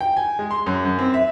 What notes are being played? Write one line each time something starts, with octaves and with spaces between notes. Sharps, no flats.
G5
G#5
G#3
C6
F#2
F#2
C4
E5